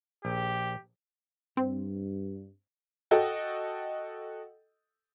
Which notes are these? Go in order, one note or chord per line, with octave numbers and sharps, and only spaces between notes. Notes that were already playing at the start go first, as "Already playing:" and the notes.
A#1 G4
G2 C4
F#4 A4 D#5 G5